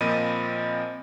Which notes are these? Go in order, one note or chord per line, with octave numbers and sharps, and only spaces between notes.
A#2 F3 C4 D#5 B5 D#7